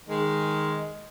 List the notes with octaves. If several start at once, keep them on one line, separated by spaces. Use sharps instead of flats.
D#3 G#3